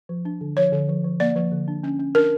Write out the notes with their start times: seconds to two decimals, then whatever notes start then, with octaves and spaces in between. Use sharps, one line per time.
0.09 F3
0.25 D4
0.41 D3
0.57 F3 C#5
0.73 D3
0.89 F3
1.04 F3
1.20 A#3 D5
1.36 F3
1.52 D3
1.68 D4
1.83 C#4
1.99 C#4
2.15 D4 A#4